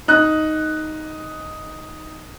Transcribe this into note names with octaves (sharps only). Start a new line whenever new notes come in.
D#4 F#6